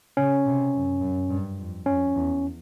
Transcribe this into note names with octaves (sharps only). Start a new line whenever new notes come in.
C#3 C#4
C3
F#2
F#2
G2
F2
F2 C#4
E2